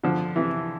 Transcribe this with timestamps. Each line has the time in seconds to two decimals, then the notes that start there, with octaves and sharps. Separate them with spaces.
0.04 D3 F3
0.36 C3 E3